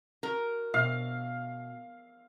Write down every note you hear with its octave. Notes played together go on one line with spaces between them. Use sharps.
F#4 A#4
B2 F5